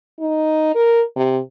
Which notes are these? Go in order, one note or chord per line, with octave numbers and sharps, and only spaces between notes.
D#4
A#4
C3